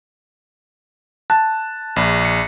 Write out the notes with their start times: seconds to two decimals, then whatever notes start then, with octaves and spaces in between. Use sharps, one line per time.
1.30 A5 F#6
1.96 A#1
2.25 C#7